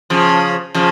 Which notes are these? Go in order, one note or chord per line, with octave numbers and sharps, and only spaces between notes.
C#3 F3
C#3 F3